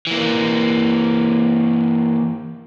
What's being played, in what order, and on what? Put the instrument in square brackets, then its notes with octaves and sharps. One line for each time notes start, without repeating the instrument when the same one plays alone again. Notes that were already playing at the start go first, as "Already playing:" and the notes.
[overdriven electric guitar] E3 A#3